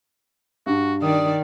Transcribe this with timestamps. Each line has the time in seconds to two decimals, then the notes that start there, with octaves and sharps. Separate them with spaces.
0.66 G2 F#4
1.02 D#3 D5 D#6